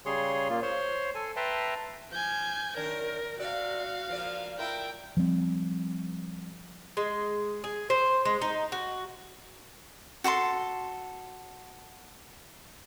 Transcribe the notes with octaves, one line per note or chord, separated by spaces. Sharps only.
C#3 G3 G#4 C#5 C6
A#2 A#3 F4
C5 C#5 C6
A4 G#5
B4 E5 G5 A5 A#5 C6
F3 G#5 G6
F#2 D#3 D4 A#4
C3 F#4 D5 F5
F3 A#3 D5
E4 F4 A#4 G5
F3 G3 C4
G#3
G#4
C5
G#3
D#4
F#4
F#4 A4 A5 C6